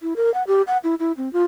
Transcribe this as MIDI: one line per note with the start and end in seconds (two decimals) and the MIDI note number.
0.02 0.14 64
0.16 0.32 70
0.34 0.43 78
0.47 0.62 67
0.67 0.77 78
0.84 0.95 64
1.00 1.12 64
1.17 1.32 60
1.33 1.44 65